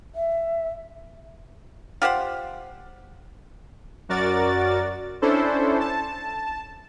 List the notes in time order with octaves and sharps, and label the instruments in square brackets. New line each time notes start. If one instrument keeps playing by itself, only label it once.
[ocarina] E5
[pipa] F4 G4 C5 F#5
[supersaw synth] F#2 F#4 A#4 D5 A6
C#4 D4 E4 A4 C5
A5